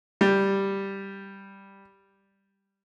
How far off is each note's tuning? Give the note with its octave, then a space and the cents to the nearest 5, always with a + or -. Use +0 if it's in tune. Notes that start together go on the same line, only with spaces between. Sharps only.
G3 +0